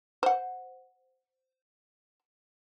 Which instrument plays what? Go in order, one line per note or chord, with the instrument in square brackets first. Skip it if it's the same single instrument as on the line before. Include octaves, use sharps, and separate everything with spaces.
[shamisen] C5 F#5